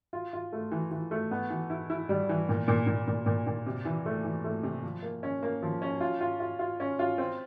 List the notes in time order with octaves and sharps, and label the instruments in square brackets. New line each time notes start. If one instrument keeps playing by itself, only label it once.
[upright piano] F4
F4
A3
E3
E3
A3
B3
E3
E4
E4
G3
E3
A#2
A#2
A#2
A#2
A#2
A#2
C3
E3
A3
E3
A3
C3
F3
A#3
C#4
A#3
F3
C#4
F4
F4
F4
F4
C#4
F4
C4